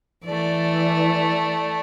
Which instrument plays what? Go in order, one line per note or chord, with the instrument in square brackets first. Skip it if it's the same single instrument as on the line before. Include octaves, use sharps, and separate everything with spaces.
[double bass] E3 [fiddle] A3 D5